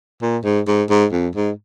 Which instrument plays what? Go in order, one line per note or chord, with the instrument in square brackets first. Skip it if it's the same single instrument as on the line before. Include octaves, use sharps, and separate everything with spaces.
[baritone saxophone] A#2
G#2
G#2
G#2
F2
G#2